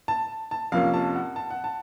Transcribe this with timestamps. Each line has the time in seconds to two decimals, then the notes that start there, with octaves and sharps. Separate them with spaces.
0.08 A5
0.51 A5
0.72 F2 C3 F3 A#3 C#4 F5
0.94 A5
1.15 F#5
1.36 A5
1.50 F#5
1.64 A5